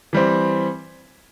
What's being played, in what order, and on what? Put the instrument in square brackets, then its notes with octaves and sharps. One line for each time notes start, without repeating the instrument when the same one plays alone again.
[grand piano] E3 G3 C4